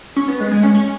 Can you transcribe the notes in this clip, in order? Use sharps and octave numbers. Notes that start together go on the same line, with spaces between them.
C#4
B3
G#3
G#3
C#4
C#4